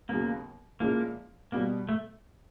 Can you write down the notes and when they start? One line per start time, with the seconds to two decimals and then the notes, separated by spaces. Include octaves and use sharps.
0.09 D#2 C#3 F#3 A#3 B3
0.80 A#2 F3 G#3 A#3 C#4 E4
1.52 B2 G3 A#3 B3
1.89 A3